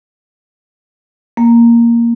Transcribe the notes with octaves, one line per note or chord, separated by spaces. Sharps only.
A#3